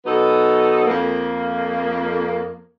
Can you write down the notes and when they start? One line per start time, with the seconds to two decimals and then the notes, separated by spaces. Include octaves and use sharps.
0.05 B2 F#3 B3 D#4 A4
0.87 F2 A#3